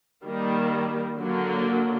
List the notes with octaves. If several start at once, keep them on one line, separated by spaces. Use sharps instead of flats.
D#3 G3 A#3
D3 F#3 A#3